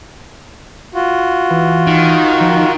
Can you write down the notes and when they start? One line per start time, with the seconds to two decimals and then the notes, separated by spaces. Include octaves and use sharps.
0.95 F4 F#4
1.50 E3
1.87 D#3
2.40 F3